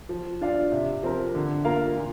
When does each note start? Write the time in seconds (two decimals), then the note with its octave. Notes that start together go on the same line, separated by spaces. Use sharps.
0.09 F3
0.41 D4 F4 D5 F5
0.72 C3
1.03 F3 C4 A#4
1.35 D3
1.65 A#3 F4 A#4 F5
1.96 A#2